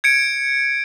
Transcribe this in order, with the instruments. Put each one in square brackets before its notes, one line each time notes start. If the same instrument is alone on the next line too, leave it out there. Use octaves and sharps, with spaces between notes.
[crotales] G#6 C#7 D7